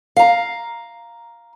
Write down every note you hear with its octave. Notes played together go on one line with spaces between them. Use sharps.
F5 A#5